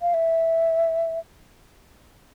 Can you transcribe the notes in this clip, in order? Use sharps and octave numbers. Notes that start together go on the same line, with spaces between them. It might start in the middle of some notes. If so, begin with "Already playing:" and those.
F5
E5